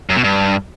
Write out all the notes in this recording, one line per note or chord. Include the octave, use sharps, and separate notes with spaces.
F#2
B2
G2